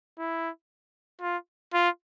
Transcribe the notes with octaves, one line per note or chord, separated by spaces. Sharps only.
E4
F4
F4